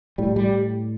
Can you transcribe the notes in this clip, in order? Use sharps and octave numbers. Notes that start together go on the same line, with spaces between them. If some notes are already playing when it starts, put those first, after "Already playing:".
A2 G3
G3